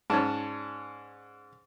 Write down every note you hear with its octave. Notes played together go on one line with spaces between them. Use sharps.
G#2 C#4 D5 A5